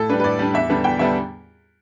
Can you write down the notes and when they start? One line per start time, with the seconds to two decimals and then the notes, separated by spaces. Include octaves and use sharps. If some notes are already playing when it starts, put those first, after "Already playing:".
Already playing: A2 A4
0.09 G3 D4 B4
0.20 B4
0.24 A2 D5
0.39 G3 D4
0.54 E2 E5
0.70 D3 G3 B3 D4
0.84 E2 G5
0.99 D3 G3 B3 D4 E5